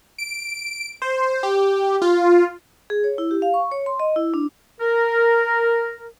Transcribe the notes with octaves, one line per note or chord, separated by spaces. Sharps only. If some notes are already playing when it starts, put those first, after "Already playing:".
D7
C5
G4
F4
G#4
C#5
E4
G4
F5
C#6
C#5
C6
D#5
E4
D4
A#4